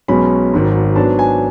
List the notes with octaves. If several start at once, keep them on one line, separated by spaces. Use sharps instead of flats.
B1 B2 G#3 C#4 B5
G#1 G#2 F#3
G#2 F#3 B3 D4 A5
G#5